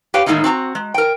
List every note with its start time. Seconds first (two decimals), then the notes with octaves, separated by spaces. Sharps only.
0.14 G4 B4 C#5 F5 G5
0.26 A2 D#3 G#3 A#3 D#4 E4
0.44 C4 F#4 A5 A#5
0.75 G#3
0.94 A#4 G5